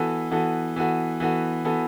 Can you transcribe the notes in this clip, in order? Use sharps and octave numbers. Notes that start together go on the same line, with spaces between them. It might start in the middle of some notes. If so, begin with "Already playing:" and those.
Already playing: E3 B3 F#4 A4
E3 B3 F#4 A4
E3 B3 F#4 A4
E3 B3 F#4 A4
E3 B3 F#4 A4